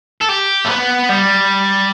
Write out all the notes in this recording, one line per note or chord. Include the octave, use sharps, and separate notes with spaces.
A4
G4
A3
B3
G3